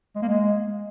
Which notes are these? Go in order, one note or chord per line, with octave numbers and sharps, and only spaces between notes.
G#3
A#3
G#3